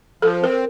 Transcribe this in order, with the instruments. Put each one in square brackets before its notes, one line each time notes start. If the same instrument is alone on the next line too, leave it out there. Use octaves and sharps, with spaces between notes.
[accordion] F3 [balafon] A4
[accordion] C4 [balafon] A#4